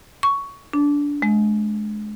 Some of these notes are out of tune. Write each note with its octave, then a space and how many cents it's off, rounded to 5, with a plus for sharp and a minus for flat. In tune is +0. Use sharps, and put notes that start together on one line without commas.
C#6 +10
D4 -20
G#3 +30